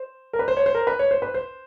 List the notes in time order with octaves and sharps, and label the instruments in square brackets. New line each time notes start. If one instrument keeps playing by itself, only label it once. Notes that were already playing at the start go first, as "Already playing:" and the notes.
Already playing: [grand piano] C5
A#4
B4
C5
C#5
C5
A#4
B4
C#5
C5
B4
C5